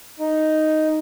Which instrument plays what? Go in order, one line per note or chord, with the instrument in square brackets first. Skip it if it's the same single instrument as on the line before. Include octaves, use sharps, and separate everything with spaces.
[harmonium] D#4